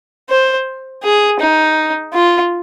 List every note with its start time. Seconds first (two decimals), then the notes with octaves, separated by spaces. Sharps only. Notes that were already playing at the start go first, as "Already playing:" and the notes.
0.30 C5
1.03 G#4
1.40 D#4
2.14 F4